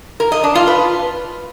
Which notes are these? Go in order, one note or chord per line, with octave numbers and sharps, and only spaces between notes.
A#4
D#5
D4
F4
B4